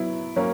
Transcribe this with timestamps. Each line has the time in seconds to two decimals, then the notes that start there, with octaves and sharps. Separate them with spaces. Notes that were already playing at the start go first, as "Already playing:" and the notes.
Already playing: F#3 B3 E4
0.36 F#3 A#3 C#4